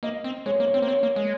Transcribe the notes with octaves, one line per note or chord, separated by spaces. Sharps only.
A#3 D#5
C4
G#3 C#5
C#5
A#3
C#5
C4
C5
A#3
C4 C#5
A#3
G#3